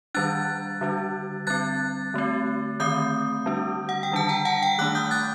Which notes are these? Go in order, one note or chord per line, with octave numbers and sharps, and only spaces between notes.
D#3 G3 D4 F#6 A6
D3 G3 D4
G3 C4 F#6 A6
D3 A3 C4
D#3 A3 C4 D#6 G6
D3 G3 D4
F#5
G5
D#3 G3 D4 A5
G5 A#5
F#5 A5
G5
D#3 A3 D4 D6 F#6
D#6 G6
F#6 A6